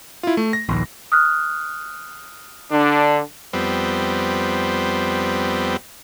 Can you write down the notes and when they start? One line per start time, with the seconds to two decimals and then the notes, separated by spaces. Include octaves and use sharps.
0.23 E4 F4
0.37 A3
0.53 A#6
0.69 A#1 D#2
1.12 D#6 F6 F#6
2.71 D3 D4
3.53 F2 G3 B3 C4